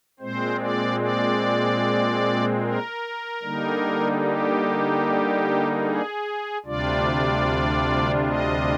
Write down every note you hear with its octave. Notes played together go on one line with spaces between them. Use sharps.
A#2 G#3 C4 C5
D5
D5
A#4
D3 G3 A#3 D#4
G4
G#4
D2 C3 G3 D4 F4 D5
D#5